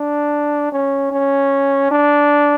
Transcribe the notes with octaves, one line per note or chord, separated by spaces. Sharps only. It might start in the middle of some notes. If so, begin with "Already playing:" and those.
Already playing: D4
C#4
C#4
D4